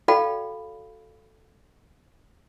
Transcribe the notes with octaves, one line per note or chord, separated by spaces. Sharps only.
F#4 A4 D5 F5 G5 B5